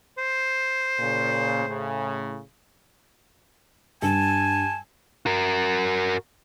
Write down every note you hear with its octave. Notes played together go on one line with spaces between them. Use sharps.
C5
A#2 C#3
A2 C#3
G2 G#5 A5
F#4 A#4